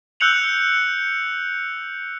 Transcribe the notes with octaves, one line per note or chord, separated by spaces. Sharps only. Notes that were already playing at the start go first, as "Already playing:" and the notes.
E6 F#6 G6 C#7 F7 F#7